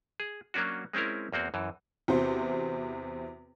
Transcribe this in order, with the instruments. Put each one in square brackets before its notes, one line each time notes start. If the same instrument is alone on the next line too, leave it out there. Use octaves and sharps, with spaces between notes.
[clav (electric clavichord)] G#4
F#3 A#3 C#4 D4 F#4
G#3 C4 C#4 E4 A#4
E2 A#3 C4 F#4
F#2 E3
[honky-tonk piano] E2 C3 F#4 C5